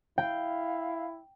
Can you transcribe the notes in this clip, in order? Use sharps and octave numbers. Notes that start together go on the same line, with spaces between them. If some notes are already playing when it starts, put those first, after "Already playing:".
E4 F5 G5